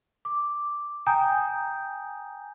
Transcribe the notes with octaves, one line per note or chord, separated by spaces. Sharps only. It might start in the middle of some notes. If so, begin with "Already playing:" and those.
D6
G5 G#5 A#5 D#6 G6